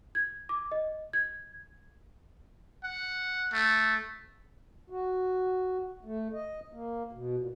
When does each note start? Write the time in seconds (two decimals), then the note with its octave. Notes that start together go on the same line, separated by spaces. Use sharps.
0.15 G#6
0.49 D6
0.72 D#5
1.13 G#6
2.84 F#5
3.53 A3
4.90 F#4
6.05 A3
6.33 D#5
6.72 A#3
7.12 B2
7.38 A#2